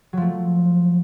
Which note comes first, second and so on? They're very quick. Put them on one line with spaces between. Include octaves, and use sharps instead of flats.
F#3 F3 A3